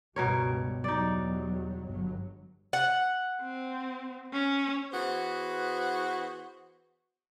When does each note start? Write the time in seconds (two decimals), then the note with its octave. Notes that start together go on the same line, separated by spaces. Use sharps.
0.16 C#2 G2 B2 G3 A#4 C#5
0.84 E2 F#3 G3 D#4 D5
1.86 G1 F#3
2.73 F#5
3.41 C4
4.33 C#4
4.92 E3 B3 F#4 G#4 C5